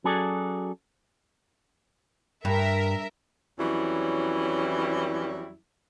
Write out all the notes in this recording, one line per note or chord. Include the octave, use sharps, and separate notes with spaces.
F#3 C#4 F#4 G#4 A4 D5
G2 A#4 E5
F2 E3 F#3 G3 C#4 E4